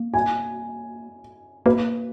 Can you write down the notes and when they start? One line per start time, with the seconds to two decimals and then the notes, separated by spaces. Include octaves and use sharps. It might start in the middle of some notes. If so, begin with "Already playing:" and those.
Already playing: A#3
0.14 G#5
1.66 A#3 B4